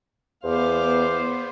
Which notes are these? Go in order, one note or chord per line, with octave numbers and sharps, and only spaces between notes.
E2 B3 C5 F5 D6